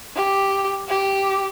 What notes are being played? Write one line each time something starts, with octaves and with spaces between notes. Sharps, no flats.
G4
G4